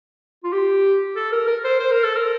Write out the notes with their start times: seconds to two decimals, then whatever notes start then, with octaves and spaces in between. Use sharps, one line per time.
0.44 F4
0.52 G4
1.16 A4
1.32 A#4
1.47 A#4
1.64 C5
1.80 C5
1.91 A#4
2.04 A4
2.16 A#4